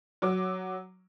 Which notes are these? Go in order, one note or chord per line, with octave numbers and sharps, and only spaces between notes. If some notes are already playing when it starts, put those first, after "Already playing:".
F#3 D6